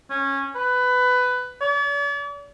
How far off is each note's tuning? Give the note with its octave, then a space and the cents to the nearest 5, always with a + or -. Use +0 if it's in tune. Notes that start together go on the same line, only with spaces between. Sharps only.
C#4 -15
B4 +15
D5 -45